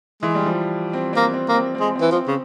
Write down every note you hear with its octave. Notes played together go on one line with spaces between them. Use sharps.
E3 G#3
G3
F3
C4
A#3 C4
C4
A#3
C4
C4
G#3
C4
E3
F3
C4
C#3